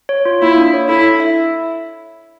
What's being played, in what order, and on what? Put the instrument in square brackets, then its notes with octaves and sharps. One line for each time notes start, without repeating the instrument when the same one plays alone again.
[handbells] C#5
F4
[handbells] A#3 [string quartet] E4
[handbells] D4
C#5
[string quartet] E4 [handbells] A4
[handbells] E4
E5